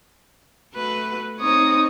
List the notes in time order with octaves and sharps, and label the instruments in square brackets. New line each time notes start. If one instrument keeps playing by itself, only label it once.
[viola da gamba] A3 F#4 B4
[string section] C4 D#4 [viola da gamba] C#5 [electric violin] D#6